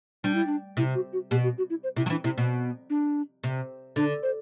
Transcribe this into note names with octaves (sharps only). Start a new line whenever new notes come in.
G3 D4
E4
D4
C3 E4
F#4
F#4
B2 G4
F#4
F#4
E4
C5
C3 E4
F#3
E3 D4
C3 E4
B2
D4
C3
D3 D4
C5